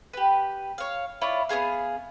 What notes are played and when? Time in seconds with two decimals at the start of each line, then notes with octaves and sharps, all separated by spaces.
0.13 G4 B4
0.78 C#5 F5
1.21 E4 F4 C#5 D5
1.49 B3 G4 G#4 F5